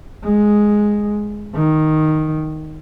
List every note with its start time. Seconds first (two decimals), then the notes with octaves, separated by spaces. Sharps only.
0.24 G#3
1.55 D#3